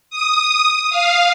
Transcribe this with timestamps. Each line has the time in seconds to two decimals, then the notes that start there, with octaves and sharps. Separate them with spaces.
0.10 D#6
0.90 F5